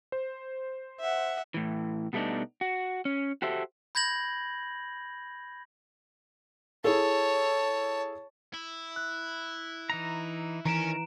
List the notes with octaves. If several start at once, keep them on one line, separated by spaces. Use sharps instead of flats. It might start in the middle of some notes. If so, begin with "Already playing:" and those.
C5
E5 F#5
A2 E3
B2 G3 A3 B3 D4 D#4
F#4
C#4
F#4 G4 A4 C5 E5
B5 G6 G#6 A#6 F#7
E4 G#4 A4 C#5 A5
E4
F#6
E3 D#4 A#5
D#3 E3 C#4 A#4 A#5 D7 E7